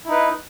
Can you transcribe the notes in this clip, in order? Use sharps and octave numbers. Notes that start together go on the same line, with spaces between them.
D#4 E4 B4